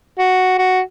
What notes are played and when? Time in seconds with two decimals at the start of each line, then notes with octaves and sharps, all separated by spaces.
0.18 F#4
0.59 F#4